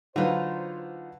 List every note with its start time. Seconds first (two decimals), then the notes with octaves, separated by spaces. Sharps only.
0.16 D3 F#3 D#4 F4 B4 C5